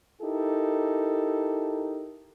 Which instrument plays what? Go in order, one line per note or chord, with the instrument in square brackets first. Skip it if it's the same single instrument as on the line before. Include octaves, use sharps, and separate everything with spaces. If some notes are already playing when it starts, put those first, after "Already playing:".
[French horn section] D#4 E4 G4 A4 A#4